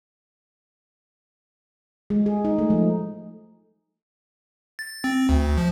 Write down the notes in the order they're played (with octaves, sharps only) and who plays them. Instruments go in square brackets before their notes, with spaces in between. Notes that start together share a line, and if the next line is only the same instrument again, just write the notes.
[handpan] G#3
G#4
D#4
A3
F3
[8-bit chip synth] A6
C4
D2
F3